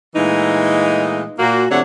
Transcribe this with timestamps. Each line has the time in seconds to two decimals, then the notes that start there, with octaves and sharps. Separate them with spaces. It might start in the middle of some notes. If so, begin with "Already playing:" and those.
0.16 A#2 E3 G#3 A3 D#4
1.39 A#2 A#3 F#4
1.70 C3 F3 A3 D4 C#5 F#5